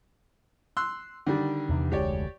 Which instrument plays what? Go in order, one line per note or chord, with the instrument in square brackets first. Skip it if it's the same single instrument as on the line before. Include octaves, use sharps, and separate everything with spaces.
[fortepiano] C6 E6 F#6
D3 D#3 G3
[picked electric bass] E2 C3 E3
[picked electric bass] F1 D2 G#3 [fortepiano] G4 C#5 D5